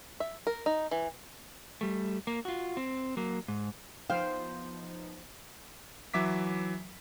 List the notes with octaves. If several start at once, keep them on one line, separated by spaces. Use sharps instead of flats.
E5
A#4
D#4
E3
G3 A3
A#3
F4 F#4
C4
F#3 A#3
G#2
F3 B3 D#4 C5 F5 G5
E3 F#3 E5 D6 B6